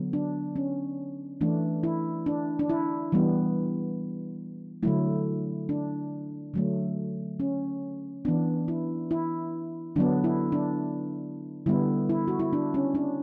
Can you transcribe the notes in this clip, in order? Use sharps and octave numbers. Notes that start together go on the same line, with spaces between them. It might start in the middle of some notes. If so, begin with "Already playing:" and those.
Already playing: D3 F#3 B3
D4
C#4
E3 A3 D4
E4
D4
D4
E4
E3 G3 B3
D3 F#3 A3 E4
D4
D3 F#3 A3
C#4
E3 B3 D4
E4
E4
D3 F#3 B3 D4
E4
D4
D3 G3 B3 E4
E4
F#4
E4
D4
C#4
D4